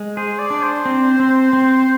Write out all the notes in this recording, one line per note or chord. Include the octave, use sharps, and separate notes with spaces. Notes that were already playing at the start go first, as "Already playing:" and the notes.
Already playing: G#3
G#4 C5
D5
D4
C5
C4
C4
C4